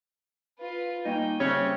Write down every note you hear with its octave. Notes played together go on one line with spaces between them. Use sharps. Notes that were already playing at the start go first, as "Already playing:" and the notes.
F4 B4
G3 A#3 C#4 D#4 G5
C#3 G3 C4 C#5 E5